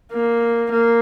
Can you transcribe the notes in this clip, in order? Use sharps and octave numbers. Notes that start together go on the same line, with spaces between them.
A#3
A#3